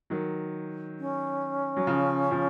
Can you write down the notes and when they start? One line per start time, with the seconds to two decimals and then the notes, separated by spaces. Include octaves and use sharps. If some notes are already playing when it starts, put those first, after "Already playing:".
0.10 D#3 F#3
0.99 C#4
1.77 F#3
1.87 C#3 F3
2.31 C#3 F3